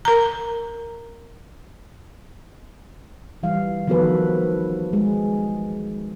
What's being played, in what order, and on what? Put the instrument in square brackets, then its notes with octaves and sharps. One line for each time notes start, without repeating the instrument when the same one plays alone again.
[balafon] A#4 A#5
[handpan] E3 G3 F5
D#3 F3 B3 F#4 A4 B4
G#3